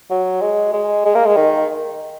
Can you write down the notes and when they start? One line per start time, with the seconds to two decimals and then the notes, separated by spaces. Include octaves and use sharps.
0.10 F#3
0.42 G#3
0.73 G#3
1.05 G#3
1.15 A#3
1.25 G#3
1.37 D#3